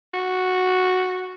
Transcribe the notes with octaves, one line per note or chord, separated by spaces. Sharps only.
F#4